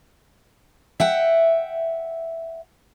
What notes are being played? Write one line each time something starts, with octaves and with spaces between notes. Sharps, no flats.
E5 F#5 G5